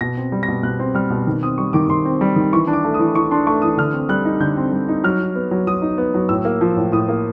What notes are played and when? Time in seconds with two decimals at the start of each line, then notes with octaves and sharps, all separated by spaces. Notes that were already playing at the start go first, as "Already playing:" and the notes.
0.01 B2 A#6
0.17 C4
0.32 G3
0.43 A#6
0.48 B2
0.63 B2 F#6
0.79 C4
0.95 G3 F6
1.10 B2
1.27 D#3
1.42 C4 D#6
1.58 G3 C#6
1.73 D#3 D6
1.89 D#3 C6
2.05 C4
2.21 G3
2.36 D#3
2.53 E3 C#6
2.67 D4
2.73 D6
2.84 A3
2.94 D#6
2.99 E3
3.15 E3 C#6
3.31 D4 C6
3.47 A3 C#6
3.62 E3 D#6
3.77 D3 F6
3.93 C4
4.09 G3 F#6
4.25 D#4
4.40 D3 G6
4.57 C4
4.72 G3
4.89 D#4
5.04 F#3 F6
5.19 D#4
5.35 B3
5.51 F#3
5.67 F#3 D#6
5.82 D#4
5.98 B3
6.14 F#3
6.29 A2 E6
6.45 A#3
6.61 F3
6.77 A2
6.92 A2 D#6
7.09 A#3